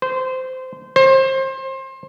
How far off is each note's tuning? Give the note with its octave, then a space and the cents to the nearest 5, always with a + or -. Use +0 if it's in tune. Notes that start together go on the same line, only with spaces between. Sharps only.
C5 -20
C5 +25